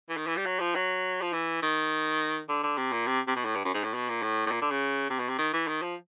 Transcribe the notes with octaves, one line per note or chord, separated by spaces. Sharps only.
E3
D#3
E3
G3
F#3
F3
F#3
F3
E3
D#3
D3
D3
C3
A#2
C3
C3
B2
A2
G2
F#2
G#2
A2
B2
A#2
A2
A2
A#2
D3
C#3
C3
B2
C3
D#3
E3
D#3
F3